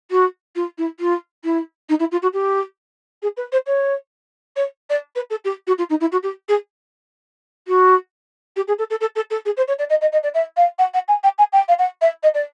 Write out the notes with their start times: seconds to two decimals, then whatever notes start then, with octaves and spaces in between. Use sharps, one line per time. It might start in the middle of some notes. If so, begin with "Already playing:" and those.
0.11 F#4
0.56 F4
0.78 E4
1.00 F4
1.44 E4
1.89 D#4
2.00 E4
2.11 F4
2.22 F#4
2.33 G4
3.22 G#4
3.37 B4
3.52 C5
3.67 C#5
4.56 C#5
4.90 D5
5.15 B4
5.30 A4
5.45 G4
5.67 F#4
5.78 F4
5.90 D#4
6.01 E4
6.12 F#4
6.23 G4
6.48 G#4
7.68 F#4
8.56 G4
8.68 G#4
8.78 A4
8.90 A4
9.01 A4
9.16 A4
9.30 A4
9.45 G#4
9.57 C5
9.68 C#5
9.79 D5
9.90 D#5
10.01 D#5
10.12 D#5
10.23 D5
10.34 E5
10.57 F5
10.79 F#5
10.94 F#5
11.08 G#5
11.23 G5
11.38 G#5
11.53 G5
11.68 F5
11.79 F#5
12.01 E5
12.23 D#5
12.34 D5